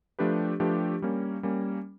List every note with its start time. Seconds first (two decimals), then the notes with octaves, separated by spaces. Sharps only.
0.19 F3 A3 D4 G4 B4
0.60 F3 A3 D4 G4 B4
1.02 G3 A#3 C#4
1.43 G3 A#3 C#4